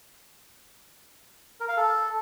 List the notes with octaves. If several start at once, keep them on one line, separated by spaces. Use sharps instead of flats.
A#4
F5
A4